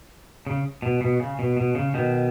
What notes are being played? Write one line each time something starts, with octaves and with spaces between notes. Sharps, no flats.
C#3
B2
B2
C#3
B2
B2
C#3
B2 D#3